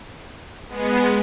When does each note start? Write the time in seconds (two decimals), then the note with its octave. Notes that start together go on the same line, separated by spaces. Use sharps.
0.69 G#3 B3